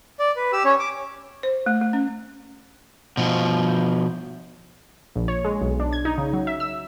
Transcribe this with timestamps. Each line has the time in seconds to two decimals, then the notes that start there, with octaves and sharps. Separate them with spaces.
0.20 D5
0.36 B4
0.53 G4 E6
0.65 C#4 C#5
0.79 D6
1.43 C5
1.66 A3
1.81 A3
1.93 C#4
3.17 B2 F3
5.16 A#1
5.28 C#5
5.45 G#3
5.62 B1
5.80 D4
5.93 G#6
6.05 D#4
6.18 C#3
6.33 F#3
6.47 E5
6.60 E6